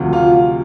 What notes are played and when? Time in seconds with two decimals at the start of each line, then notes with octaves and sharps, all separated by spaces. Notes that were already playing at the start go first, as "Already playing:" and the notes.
Already playing: D2 C3 F3
0.13 F4